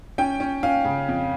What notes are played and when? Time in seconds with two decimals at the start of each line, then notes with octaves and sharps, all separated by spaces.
0.18 C#4 G5
0.40 C#4
0.63 C#4 F5
0.85 C#3
1.08 F2